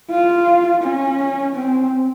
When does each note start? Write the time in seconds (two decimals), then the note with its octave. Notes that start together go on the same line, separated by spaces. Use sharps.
0.11 F4
0.83 C#4
1.55 C4